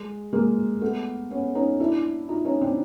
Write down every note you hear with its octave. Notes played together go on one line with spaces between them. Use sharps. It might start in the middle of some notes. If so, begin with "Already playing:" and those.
Already playing: G#3
G#3 A#3
A3 B3
B3 C#4
C#4 D#4
D4 E4
D#4 F4
C#4 D#4
C4 D4